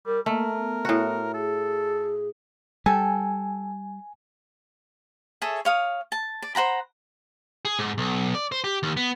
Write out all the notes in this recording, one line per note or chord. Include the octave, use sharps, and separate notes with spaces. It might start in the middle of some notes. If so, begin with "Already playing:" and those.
G3 A#4
A3 A#3 A#4
B3
A2 F#4
G#4 A4
G3 A4 G5 G#5
G#4 A4 C#5 E5
C#5 F5 D#6
A5
D5
C5 F#5 A#5 B5
G#4
G#2
B1
D5
C5
G4
D#2
B3